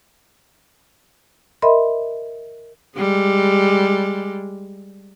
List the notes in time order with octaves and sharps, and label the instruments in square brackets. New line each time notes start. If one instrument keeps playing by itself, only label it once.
[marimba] A#4 D#5 E5 B5 C6
[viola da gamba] G3 G#3